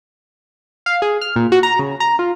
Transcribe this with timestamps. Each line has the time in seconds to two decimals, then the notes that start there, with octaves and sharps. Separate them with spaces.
0.86 F5
1.02 G#4
1.21 F6
1.36 A#2
1.52 F#4
1.63 A#5
1.79 C#3
2.00 A#5
2.19 F4